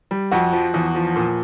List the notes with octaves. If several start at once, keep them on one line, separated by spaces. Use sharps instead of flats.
G3
F2 F#4
F3
E2
F3
A#2